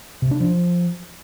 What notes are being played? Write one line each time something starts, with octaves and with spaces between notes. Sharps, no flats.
C3
D4
F3